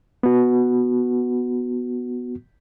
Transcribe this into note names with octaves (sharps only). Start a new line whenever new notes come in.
B3 F#4